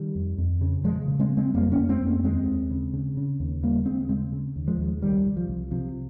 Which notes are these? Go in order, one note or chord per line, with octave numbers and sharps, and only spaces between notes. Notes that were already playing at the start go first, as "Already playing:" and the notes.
Already playing: D#3 G3
F2
F2
C#3
C#3 F3 G#3
C#3
G#3 C4
C#3
G#3 C4
F2 G3 A#3
A#3 C#4
F2
G#3 C4
F2
A#3 C#4
D#2 G#3 C4
D#2
C#3
C#3
C#3
D#2
C#3 G3 A#3
D#2 G#3 C4
C#3 G#3 C4
C#3
D#2
F3 G#3
D#2
C2 D#3 G3
C2
F3
C2
C3 F3